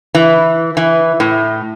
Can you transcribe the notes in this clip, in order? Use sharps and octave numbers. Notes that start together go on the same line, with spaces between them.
E3
E3
A2